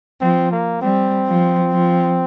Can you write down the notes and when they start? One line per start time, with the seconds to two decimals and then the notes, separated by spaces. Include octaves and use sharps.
0.21 F3 C4
0.51 A#3
0.82 G3 C4
1.27 F3
1.72 F3